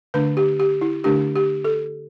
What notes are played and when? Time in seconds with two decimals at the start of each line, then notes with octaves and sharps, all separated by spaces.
0.14 D3 A3 D4 B4
0.37 G4
0.60 G4
0.81 E4
1.04 D3 A3 D4 G4
1.35 G4
1.64 A4